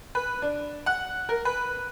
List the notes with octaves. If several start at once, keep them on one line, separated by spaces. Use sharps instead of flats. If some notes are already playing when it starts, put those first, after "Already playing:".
B4
D4
F#5
A#4
B4